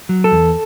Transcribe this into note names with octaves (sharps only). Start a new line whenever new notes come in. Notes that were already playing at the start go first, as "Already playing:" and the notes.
F#3
A4
E2